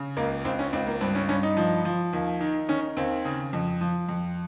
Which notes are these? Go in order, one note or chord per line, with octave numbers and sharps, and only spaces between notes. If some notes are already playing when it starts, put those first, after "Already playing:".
Already playing: C#3
C#2 A#3
C#2 C4
C#4
C#2 C4
A#3
G2 C4
C#4
G2 C#4
D#4
F3
F3
D#2
D#3
D#3 C#4
D#2 C4
C#3
F2
F3
F2